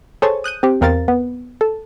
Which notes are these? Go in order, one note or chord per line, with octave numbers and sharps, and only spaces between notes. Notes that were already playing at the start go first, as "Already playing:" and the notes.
G#4 A4 C5 C#5 G#5 A5
D#6 F#6 G6 D#7
C4 G4
E2 C4 A#4 F5 A6
B3
A4